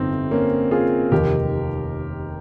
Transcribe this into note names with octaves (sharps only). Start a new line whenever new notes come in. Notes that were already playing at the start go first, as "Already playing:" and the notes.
Already playing: G1 F2 C3 C4 D#4
A#3 C#4
F4 G#4
F1 D#2 D#3 G4 A#4